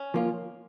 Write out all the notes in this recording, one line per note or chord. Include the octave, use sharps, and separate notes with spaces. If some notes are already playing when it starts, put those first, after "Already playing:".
Already playing: C#4
F3 A#3 F4